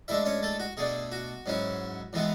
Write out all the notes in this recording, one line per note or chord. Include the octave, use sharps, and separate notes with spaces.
A2 G#3 D4 E4 E5
C#4 C#5
A3 A4
F#4
B2 A3 D4 G#4
F#4
G#2 F#3 C#4 E4
A2 E3 G#3 B3 E4